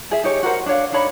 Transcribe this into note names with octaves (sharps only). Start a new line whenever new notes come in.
G#4 E5
D#4 G4 C#5
F#4 A#4 C5 F#5
D4 C#5 F5
D4 D#4 C#5 B5